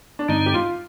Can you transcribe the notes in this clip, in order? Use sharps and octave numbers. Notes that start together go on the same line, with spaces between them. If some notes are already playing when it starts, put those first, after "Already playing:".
D4
G2 D3 G#3 C4 D#4
G4
F4